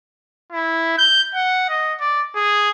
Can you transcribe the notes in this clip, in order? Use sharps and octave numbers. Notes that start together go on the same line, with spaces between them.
E4
G6
F#5
D#5
D5
G#4